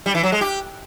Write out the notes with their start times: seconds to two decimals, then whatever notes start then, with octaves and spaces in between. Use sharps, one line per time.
0.06 G3
0.15 E3
0.23 F#3
0.32 G#3
0.41 G4